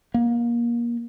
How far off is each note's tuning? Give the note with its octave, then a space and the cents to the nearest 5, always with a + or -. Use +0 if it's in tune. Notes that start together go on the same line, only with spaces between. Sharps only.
A#3 +25